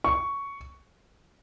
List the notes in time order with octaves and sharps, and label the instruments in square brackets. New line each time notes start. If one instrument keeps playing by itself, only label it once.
[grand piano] C#6